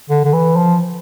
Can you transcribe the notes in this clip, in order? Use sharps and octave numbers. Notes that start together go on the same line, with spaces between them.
D3
D3
E3
F3